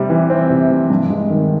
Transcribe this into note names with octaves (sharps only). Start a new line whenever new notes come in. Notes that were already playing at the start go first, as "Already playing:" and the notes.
Already playing: C3 G3
E3
C4
C3
G3
G2
G#3
D#3